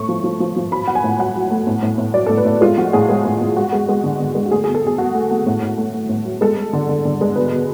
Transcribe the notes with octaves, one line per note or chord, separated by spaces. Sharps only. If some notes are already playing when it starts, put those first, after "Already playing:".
Already playing: A2 A3 C#6
F3
F3
F3
F3
F#3 B5
F#3 F#5
G#5
A2
F#3 F#5
F#3
A3
A2
A2
A2
F#3 D5
A2 A4
B4
A2
G#3 F4
F3 F#4
A2 G#4
G#3
A2
A2
G#3 F#4
G#3
G#3
D3
D3
G#3
F#4
A3 G#4
B2 G#4
A4
B2 G#4
B2 F#4
A3
A3
A2
A2
A3
A3
A2
F#3
G#3 A4
G#3
D3
D3
D3
G#3
B2 B4
B2